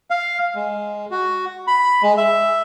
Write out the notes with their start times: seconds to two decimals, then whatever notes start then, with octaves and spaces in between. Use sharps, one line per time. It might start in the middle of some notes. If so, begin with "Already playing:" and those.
0.10 F5
0.55 G#3
1.11 F#4
1.67 B5
2.03 G#3
2.17 E5